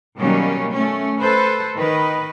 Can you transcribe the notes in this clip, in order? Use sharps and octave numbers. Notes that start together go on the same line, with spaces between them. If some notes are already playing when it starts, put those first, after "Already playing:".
B2 D#3 F#3 G3 A#3 C#4
A3 C#4
A4 B4 C5
D#3 B4 D#5